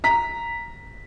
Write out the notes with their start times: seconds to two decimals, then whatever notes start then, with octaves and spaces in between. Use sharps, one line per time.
0.04 A#5 B6